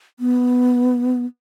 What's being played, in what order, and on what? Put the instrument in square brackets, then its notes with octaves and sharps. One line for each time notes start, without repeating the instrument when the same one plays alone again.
[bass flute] B3